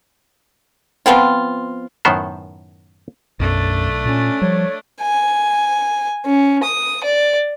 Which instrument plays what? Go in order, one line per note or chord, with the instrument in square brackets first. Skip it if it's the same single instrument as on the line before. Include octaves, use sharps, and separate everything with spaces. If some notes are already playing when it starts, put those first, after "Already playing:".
[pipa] F3 B3 C4 F4
[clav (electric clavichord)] F#2 A2 D#3 B3 C5
[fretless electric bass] B1 [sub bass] F#2 [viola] A3 D4
[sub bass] A#2 [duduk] C#4
[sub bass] F3 [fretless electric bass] G3 [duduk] C#5
[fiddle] G#5
C#4
D#6
D5